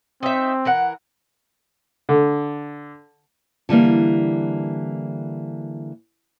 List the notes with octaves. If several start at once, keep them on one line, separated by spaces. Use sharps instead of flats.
C4 D#4 E5
E3 A#4 F#5
D3
D3 E3 G3 A#3